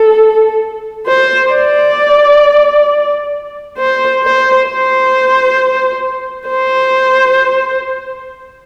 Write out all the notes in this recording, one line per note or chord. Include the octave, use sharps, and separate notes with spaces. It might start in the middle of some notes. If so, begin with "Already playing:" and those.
Already playing: A4
C5
D5
C5
C5
C5
C5